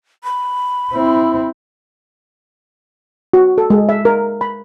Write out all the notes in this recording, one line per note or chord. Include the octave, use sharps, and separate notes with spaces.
B5
C4 E4
F#4
A4
G#3
E5
A#4
B5